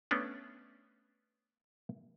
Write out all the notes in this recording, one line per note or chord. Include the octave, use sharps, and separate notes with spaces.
A3 B3 C#4 D4